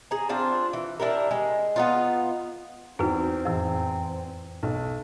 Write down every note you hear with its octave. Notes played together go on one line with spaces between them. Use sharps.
G#4 A#5
C4 D4 F4 C5
E3
D4 E4 G4 A#4
G#3
B3 D#4 F4
E2 C4 D#4 F#4
F2 A2 E3
B1